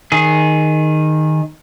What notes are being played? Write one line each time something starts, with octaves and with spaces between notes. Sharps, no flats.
D#3 G#4